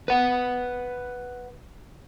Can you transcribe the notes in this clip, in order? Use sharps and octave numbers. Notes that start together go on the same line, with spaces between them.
B4 F#5